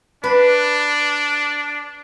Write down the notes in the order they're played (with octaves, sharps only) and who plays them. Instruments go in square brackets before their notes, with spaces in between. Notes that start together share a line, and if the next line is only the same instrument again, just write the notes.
[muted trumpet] D4 [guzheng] B4